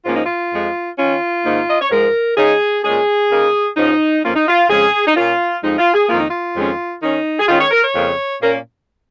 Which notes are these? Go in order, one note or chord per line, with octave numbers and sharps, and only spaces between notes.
G#2 F3 A#3 C#4 F4
D#4
F4
F2 F3 G#3
D#3 C#4 F4
G#2 D#3 A#3 D#4
D#5
C#5
G#2 F3 G#3 A#4
C#3 G#3 D#4 G#4
A#2 G#3 C#4 G#4
C#3 A#3 D#4
G#2 F3 C#4 D#4
F2 F3 A#3 C#4 F4
D#4
F4
F2 C#3 G#3 C#4 G#4
D#4
A#2 A#3 C#4 F4
F2 F3 G#3 D#4
F4
G#4
F2 D#3 A#3 F4
D#4
F4
F2 D#3 G#3 C#4
D#3 C#4 D#4
G#4
D#3 G#3 C#4 F4
C#5
A#4
C#5
F2 C#3 A#3
A#2 A#3 C#4 A#4